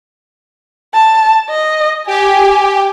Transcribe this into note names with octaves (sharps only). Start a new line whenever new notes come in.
A5
D#5
G4 G#5